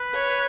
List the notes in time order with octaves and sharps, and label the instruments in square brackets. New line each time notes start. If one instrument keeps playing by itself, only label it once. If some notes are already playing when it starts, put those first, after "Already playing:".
Already playing: [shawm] B4
[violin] C#5